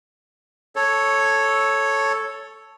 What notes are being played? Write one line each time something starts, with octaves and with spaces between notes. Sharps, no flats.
A4 C#5